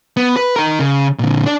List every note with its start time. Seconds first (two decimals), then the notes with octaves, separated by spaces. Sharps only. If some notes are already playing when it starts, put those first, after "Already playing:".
0.17 B3
0.36 B4
0.56 D#4 A#4
0.79 C#3
1.19 A#2 D3
1.46 D4 D5